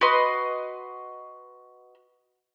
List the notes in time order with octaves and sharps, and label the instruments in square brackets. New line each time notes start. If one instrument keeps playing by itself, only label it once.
[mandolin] F#4 B4 D#5 C6